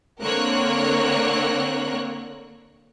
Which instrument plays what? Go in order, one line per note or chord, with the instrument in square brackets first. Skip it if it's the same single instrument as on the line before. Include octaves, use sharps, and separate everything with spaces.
[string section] D3 A#3 C4 A#4 C#5 F#6